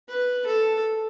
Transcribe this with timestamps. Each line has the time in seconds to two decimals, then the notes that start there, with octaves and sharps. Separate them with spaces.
0.08 B4
0.46 A4